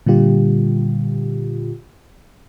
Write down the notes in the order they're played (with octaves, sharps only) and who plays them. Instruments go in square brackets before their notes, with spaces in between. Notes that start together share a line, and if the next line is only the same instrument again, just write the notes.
[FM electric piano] A#2 D3 G3 F4 G4